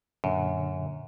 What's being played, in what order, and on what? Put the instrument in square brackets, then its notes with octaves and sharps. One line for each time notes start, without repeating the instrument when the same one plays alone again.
[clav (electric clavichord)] F#2 [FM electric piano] A#2 D3